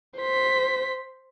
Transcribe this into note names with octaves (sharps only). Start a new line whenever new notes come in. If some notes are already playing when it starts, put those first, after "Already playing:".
C5 B6